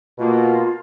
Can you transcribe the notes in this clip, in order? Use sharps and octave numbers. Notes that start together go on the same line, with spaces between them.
B2 A#3 F4